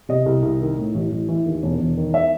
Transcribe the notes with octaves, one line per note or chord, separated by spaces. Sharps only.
C3 D#5
C2
C2
D#3
A2
A1
A1
E3
D#2
E1
E1
D#3
E5